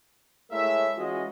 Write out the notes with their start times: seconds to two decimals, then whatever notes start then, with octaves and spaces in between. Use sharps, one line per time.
0.51 G#3 A3 E4 A#4 C#5 E5
0.96 E3 G#3 C#4 F4 F#4 D#5